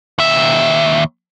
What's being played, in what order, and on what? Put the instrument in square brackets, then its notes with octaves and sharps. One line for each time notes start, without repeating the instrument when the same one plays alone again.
[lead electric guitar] D#2 E5